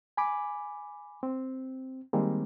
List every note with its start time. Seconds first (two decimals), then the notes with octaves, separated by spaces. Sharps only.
0.17 G#5 B5 D6
1.23 C4
2.13 D#3 G3 G#3 A#3 C4